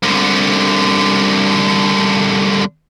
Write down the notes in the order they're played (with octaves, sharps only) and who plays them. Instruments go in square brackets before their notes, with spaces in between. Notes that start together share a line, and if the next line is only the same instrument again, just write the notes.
[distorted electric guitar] C2 D3